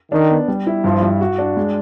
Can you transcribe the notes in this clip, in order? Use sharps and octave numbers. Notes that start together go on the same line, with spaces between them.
D#3 D4
B3
G3
E4
G2 F3
G3
F#4
D4
G#3